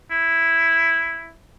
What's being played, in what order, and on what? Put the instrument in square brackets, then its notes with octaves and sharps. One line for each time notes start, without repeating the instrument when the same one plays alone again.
[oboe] E4